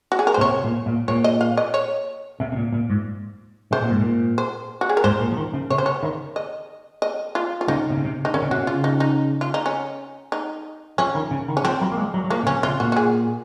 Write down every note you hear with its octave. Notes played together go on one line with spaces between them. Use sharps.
F#4
G#4
A#4
C5
A#2
C3 C#5
A#2
A#2
A#2 C#5
D#5
F5
D#5
C#5
C3
C3
A#2
A#2
G#2
C3 C5
A#2
G#2
A#2
C5
F#4
G#4
A#4
G#2 C5
A#2
F3
D#3
C#3
C3 C#5
C5
C#5
D#3
D#5
D#5
F4
F4
C#3 D#4
C3
C#3
C3
D#4
D#3 C#4
C#3
C3 F#4
C#3
F4
D#4
D#4
F4
D#4
C#4
D#4
F3 C#4
D#3
C#3
D#3
C#4
F3 C4
F#3
A#3
G#3
F#3
F#3
F3 A#3
C3
C#3 C#4
C3 F4
A#2 F#4
F#4
G#4